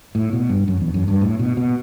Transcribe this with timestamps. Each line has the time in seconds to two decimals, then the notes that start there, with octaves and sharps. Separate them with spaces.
0.15 A2
0.33 B2
0.50 G2
0.68 F#2
0.81 E2
0.94 F#2
1.08 G2
1.21 A2
1.39 B2
1.57 B2